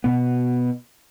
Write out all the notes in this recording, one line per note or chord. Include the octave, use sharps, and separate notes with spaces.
B2 B3